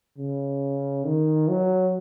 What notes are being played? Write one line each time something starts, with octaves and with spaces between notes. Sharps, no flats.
C#3
D#3
F#3